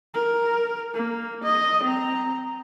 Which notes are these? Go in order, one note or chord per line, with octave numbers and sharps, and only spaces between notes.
A#4
A#3
D#5
C4 A#5